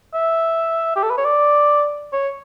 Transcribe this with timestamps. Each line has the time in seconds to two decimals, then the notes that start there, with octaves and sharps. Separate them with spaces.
0.14 E5
0.96 G4
1.03 A4
1.10 B4
1.17 C#5
1.24 D5
2.13 C#5